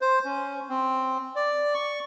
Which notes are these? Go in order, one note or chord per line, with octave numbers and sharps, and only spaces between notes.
C5
C#4
C4
D5
C#6